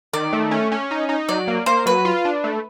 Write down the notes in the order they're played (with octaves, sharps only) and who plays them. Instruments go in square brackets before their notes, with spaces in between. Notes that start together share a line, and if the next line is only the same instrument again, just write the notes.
[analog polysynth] D#3 [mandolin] D5
[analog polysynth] A3
C#4
C#4
D#4
D#4
[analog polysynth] F#3 [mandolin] D5
[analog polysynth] A#3
[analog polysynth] A#3 [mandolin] C5
[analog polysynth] F#3 [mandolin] B4
[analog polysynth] F4
D4
A3